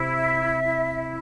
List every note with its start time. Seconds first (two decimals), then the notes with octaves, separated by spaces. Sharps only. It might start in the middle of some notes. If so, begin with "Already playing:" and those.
Already playing: C3 E4
0.17 E5
0.64 E4